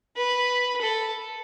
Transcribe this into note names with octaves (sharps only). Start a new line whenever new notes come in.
B4
A4